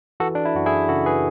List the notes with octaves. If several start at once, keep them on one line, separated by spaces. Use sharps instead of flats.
E3 F#4 A4
D4
E4
F#2 F#4
E4 G#4
C#3 F#4 A4
G#4 B4